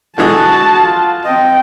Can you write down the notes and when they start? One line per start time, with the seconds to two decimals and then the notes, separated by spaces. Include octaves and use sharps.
0.18 D3 E3 G#3 F#4 A5
0.85 F4
1.25 C4 D#5 G5